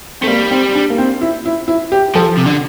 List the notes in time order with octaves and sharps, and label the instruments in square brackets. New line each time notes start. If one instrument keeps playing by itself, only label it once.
[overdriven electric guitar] A3 [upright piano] C4
[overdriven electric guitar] G3 [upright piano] A#3
[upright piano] C4
D4
A#3
C4
E4
E4
E4
G4
[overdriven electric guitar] F3 [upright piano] A4
[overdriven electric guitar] C3
D3